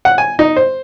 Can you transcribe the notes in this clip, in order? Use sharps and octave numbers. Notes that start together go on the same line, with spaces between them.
F#5
G#5
D#4
C5